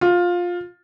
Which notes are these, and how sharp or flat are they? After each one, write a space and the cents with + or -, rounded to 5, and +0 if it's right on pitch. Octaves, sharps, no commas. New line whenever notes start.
F4 +15